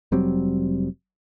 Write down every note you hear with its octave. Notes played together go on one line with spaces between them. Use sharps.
F1 F#3 G3 C4